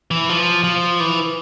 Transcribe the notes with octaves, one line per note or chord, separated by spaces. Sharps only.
E3
F3
F3
E3